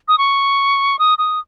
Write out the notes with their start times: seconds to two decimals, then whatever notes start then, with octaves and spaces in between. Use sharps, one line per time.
0.08 D#6
0.18 C#6
0.99 D#6
1.18 D#6